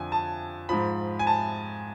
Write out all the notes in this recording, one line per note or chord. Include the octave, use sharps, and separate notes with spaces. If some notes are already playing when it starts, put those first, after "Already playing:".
Already playing: F2 D3 F3 G#5
A5
G#2 F3 B5
G#5
A5